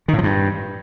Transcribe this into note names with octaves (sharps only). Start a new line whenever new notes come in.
D#3
A2
F3
G2